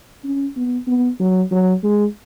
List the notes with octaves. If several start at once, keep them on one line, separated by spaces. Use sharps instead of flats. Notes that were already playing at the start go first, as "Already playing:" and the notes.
C#4
B3
B3
F#3
F#3
G#3